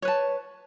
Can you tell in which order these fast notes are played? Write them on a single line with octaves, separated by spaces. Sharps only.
C#5 B4 A5